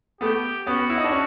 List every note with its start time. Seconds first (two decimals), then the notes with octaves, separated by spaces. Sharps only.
0.21 A3 B3 G4
0.66 B3 C#4 F#4
0.90 E4
0.98 D#4
1.04 D4
1.12 C#4